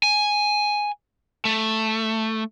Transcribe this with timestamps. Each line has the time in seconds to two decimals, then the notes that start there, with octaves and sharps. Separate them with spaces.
0.03 G#5
1.45 A3